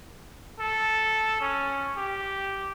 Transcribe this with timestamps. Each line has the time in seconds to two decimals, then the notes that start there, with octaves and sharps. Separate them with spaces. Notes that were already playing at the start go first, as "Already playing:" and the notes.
0.60 A4
1.41 C#4
1.97 G4